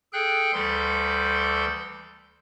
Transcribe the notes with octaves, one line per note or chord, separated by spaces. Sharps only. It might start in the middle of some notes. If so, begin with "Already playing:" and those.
G#4 A4 G5 F#6 G6
D2 E3 G3 A4 C6 G6